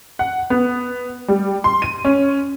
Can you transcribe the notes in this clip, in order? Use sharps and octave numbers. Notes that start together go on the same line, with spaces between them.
F#5
B3
G3
C6
D#7
C#4